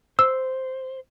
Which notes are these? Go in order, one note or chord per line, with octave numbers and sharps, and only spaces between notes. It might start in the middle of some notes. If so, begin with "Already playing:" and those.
C5 E6